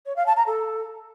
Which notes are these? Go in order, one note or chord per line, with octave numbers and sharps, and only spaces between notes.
C#5
F5
A5
A#5
A4